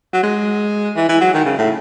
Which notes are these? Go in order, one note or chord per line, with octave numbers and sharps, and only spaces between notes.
F#3
G#3
E3
E3
F#3
D#3
C#3
A2